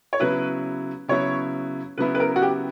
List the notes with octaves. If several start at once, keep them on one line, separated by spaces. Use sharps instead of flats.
C#5
C#3 F#3 B3 E4 B4
C#3 F#3 B3 E4 C#5
C#3 F#3 B3 E4 B4
B4
A#4
F#4
G4